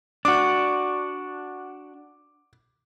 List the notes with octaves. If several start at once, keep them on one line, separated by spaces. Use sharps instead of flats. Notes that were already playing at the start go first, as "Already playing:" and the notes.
D4 F#4 D6